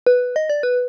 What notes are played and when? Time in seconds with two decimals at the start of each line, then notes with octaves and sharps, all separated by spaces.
0.07 B4
0.36 D#5
0.50 D5
0.63 B4